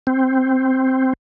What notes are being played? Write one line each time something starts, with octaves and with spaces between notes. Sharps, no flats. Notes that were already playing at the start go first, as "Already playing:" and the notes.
C4